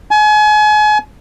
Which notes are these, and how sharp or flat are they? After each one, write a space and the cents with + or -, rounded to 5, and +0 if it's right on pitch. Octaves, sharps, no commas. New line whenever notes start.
G#5 +35